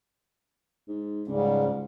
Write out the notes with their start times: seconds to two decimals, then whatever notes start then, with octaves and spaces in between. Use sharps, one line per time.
0.88 G#2
1.28 C#2 G#2 C#3 G3